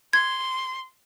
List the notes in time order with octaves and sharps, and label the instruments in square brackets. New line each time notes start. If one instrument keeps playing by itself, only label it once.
[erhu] C6 [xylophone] G#6